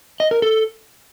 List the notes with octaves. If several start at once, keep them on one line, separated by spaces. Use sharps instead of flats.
D#5
A#4
A4